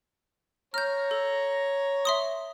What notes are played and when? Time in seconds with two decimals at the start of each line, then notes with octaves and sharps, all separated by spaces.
0.74 C#5 A#5 F6 G6
1.11 A4
2.05 E5 C6 D#6